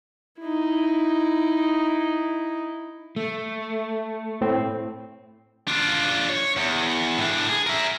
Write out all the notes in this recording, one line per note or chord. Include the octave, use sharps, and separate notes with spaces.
D#4 E4
A3
A2 C4
D4 F4
C#5
E2
A2 D4
G#4
A#4 E5